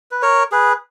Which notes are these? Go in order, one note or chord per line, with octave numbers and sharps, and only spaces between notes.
B4
A#4 C#5
G#4 B4